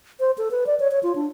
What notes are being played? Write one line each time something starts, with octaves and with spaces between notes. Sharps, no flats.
C5
A4
B4
D5
C#5
C#5
F4
D4